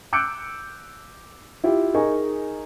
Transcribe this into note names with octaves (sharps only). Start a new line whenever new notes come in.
D6 E6 F#6 G6 C#7 D7
E4 F4 G4
D#4 G#4 A#4 D#5 G#5 C#6